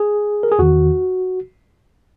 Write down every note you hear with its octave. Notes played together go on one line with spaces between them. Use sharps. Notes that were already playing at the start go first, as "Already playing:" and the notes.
Already playing: G#4
A#4
G#4
E2 D#3 F#4